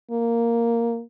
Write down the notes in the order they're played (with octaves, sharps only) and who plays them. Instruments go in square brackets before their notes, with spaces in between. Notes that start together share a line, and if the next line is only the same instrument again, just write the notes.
[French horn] A#3